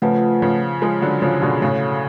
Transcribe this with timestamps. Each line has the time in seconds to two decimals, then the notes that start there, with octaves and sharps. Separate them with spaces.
0.02 C#3 F3 A3 F4 B4 F#5 A5
0.42 C#3 F3
0.82 F3 G#3
1.02 D3 F#3
1.22 C#3 F3
1.42 B2 D3
1.62 A2 C#3 F#4 A4 C#5 F5